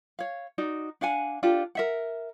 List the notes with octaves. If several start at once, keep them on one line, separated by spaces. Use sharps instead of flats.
C#5 F5
D#4 F#4 D5
D4 F5 F#5 G#5
D4 F4 G4 A4
A#4 E5 F#5